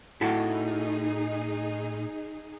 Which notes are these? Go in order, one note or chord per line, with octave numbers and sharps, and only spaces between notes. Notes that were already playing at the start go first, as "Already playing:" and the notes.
A2 D#4 E4 F#4 G#4 A4